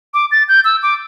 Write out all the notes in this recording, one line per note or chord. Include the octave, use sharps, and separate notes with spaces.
D6
A6
G6
E6
D6